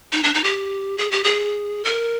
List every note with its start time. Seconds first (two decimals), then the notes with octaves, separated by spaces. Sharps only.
0.12 D#4
0.23 D4
0.34 D#4
0.44 G4
0.98 G#4
1.11 G4
1.24 G#4
1.85 A#4